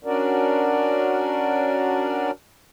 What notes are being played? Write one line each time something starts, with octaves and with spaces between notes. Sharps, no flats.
C#4 D4 F#4 A#4 D5